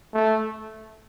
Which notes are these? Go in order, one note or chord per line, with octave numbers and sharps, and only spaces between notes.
A3